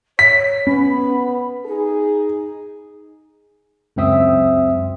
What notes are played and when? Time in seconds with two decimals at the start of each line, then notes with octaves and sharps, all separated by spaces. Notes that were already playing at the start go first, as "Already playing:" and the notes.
0.19 C#5 B6
0.67 B3 C#4 B5
1.65 D#4 G#4
3.96 C#2 F#2 C4 E5 D#6